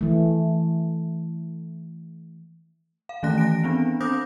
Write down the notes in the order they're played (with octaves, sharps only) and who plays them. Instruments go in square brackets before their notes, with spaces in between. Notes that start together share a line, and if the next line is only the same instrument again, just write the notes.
[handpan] E3 A3
[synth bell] F5
D#3 E3 A3 C#4 F#6 A#6
A#6 D7
B3 C4 D4
C4 C5 D6 D#6 G6 A#6